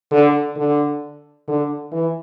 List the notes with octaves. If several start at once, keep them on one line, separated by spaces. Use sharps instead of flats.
D3
D3
D3
E3